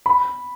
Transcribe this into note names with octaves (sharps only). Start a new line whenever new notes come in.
B5